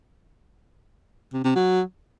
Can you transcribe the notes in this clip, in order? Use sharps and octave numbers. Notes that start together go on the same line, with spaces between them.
C3
C3
F#3